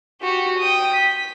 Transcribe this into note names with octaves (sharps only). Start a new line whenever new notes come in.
F#4 G4
G5 D#6
B6